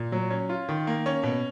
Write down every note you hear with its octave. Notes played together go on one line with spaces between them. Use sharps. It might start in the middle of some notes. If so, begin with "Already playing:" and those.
Already playing: A#2
F#3
C#4
F4
D#3
A#3
C#4
B2